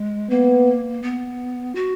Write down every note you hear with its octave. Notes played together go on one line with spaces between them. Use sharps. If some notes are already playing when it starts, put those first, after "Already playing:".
Already playing: G#3
A#3 B3
B3
F#4